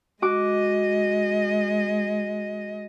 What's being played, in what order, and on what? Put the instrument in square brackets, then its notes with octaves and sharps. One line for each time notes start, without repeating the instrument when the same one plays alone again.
[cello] G#3 D#5 [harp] F#4 D6